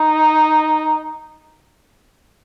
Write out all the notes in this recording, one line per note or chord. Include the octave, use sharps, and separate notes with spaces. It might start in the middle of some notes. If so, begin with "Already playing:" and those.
Already playing: D#4